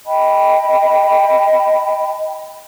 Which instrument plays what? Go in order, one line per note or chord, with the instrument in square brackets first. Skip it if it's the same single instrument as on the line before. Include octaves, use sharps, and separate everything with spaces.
[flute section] D#5 G5 A5 B5